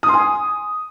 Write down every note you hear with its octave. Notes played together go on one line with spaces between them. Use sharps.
D#6
C6
G#5